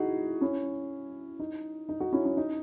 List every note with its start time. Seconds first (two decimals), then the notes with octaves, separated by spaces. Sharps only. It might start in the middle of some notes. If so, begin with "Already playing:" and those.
Already playing: D#4 E4 F#4 G#4
0.41 C#4 E4
1.39 D#4
1.89 D#4
2.00 D#4 F#4
2.13 C#4 E4
2.25 C#4
2.37 D#4